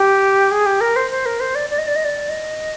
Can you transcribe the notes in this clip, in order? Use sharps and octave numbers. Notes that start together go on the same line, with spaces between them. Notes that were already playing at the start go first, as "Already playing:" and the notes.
Already playing: G4
G#4
G4
A#4
C5
C5
A#4
C5
D5
D5
D#5
D5
D#5
D5
D#5